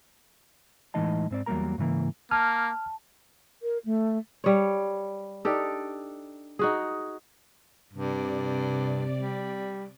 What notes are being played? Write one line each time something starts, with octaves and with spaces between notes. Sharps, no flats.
A2 E3 G#3 D#4 D#5 A5
G#2 C4 D5
E2 F#3 G3 A#3 A#4 A#5
G#2 C#3 E3 A#3
A#3 A5 F6
A#4
A3
G3 C#5
D4 D#4 G4 A4
D#4 F#4 G#4
G2 C3 D5
G3